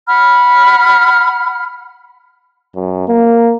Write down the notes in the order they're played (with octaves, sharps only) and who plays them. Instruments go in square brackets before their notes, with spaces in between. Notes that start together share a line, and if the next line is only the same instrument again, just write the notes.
[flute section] F#5 B5 F6
[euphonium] F#2
A#3